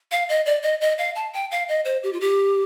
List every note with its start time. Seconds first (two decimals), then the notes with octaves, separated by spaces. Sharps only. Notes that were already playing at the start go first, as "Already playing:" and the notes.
0.11 F5
0.29 D#5
0.46 D5
0.63 D#5
0.81 D#5
0.98 F5
1.15 A5
1.33 G5
1.51 F5
1.68 D#5
1.85 C5
2.03 G4
2.13 F4
2.20 G4